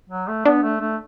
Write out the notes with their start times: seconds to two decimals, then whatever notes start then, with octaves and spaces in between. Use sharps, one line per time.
0.10 F#3
0.28 A3
0.45 B3 D4
0.63 A3
0.80 A3